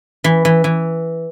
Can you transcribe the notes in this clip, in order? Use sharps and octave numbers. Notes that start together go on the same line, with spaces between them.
E3
E3
E3